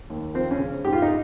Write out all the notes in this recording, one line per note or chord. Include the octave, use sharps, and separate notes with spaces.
D#2
F3 C4
C#4
C#3
G#2 G4
F4
D#4